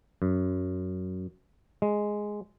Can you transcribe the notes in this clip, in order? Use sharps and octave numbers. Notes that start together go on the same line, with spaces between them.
F#2
G#3